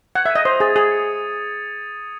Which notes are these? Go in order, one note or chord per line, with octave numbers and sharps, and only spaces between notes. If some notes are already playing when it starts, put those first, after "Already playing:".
F#5 G#6
E5
D#5 D#7
C5 D#6
G#4 A6
G#4 G#6
C#7